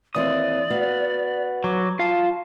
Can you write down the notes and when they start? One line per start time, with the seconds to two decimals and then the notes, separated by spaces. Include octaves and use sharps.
0.15 D#2 E3 C4 D5 D#6
0.70 B3 F#4 F5
1.64 F#3 D6
1.99 F4 F5 A5